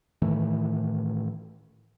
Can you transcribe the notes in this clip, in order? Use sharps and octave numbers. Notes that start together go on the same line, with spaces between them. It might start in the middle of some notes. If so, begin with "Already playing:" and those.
A2 D#3 E3 A3